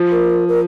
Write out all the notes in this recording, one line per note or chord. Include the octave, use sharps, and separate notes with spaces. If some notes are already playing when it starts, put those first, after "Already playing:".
Already playing: F3
A#4
A#4